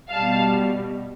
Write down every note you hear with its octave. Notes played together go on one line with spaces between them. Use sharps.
B2 G3 F5 A5